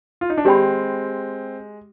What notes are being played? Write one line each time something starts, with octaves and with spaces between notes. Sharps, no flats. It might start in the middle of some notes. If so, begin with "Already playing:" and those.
F4
D#4
D4
G#3 C4 G4 D5 G5 B5